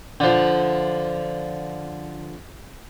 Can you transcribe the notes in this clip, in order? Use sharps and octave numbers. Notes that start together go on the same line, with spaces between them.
D3 F3